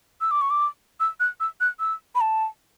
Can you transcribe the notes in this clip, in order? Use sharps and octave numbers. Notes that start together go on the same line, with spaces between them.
E6
D6
C#6
D6
E6
F#6
E6
F#6
E6
B5
A5